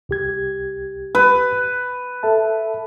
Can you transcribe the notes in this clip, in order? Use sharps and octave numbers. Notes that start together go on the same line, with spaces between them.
C2 G4 G#6
B4
A4 E5 A5